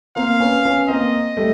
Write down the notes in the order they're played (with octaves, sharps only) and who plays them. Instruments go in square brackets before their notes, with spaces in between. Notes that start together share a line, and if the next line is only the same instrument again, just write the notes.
[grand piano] A#3 C4 [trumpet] F5
[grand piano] B3 C#4
B3 C#4
[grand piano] A#3 C4 [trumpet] D#5
[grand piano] G3 A3